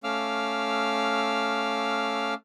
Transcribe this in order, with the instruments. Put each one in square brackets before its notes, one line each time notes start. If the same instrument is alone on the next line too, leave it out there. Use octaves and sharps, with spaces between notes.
[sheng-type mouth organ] A3 C#4 F5 D6 E6 F6